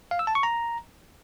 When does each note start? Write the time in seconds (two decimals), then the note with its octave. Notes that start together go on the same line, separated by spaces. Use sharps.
0.11 F5
0.19 E6
0.27 A5
0.35 C#6
0.43 A#5